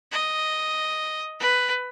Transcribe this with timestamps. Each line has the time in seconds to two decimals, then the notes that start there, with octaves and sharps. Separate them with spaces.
0.12 D#5
1.40 B4